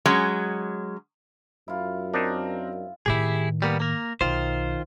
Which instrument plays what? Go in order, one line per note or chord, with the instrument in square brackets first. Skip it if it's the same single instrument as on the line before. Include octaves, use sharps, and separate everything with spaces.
[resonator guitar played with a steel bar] F#3 G#3 C#4
[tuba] F#2 [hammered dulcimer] E4 F4
[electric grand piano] C4 A#4 [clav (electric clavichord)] D4 D#4
[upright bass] A2 D#3 [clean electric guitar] E4 G4 G#4
[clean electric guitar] G3 A#3 B3
A#3 A#4
[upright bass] B1 [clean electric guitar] D#3 F4 C5